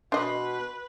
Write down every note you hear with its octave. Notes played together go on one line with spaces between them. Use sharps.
B2 D4 B4 D#5 C6